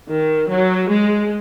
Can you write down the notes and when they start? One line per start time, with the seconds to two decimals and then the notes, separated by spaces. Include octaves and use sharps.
0.10 D#3
0.50 F#3
0.89 G#3